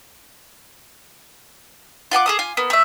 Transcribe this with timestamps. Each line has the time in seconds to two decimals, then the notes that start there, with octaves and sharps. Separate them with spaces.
2.11 F4 F#5 G#5 D6
2.26 G#4 A4 D#6
2.39 F4 G#5
2.57 A#3 B3
2.70 A3 E5